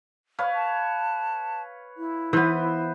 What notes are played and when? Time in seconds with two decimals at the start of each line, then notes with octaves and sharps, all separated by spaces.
0.39 B4 C#5 F5
0.55 A5
1.97 E4
2.33 E3 B3 B4 C5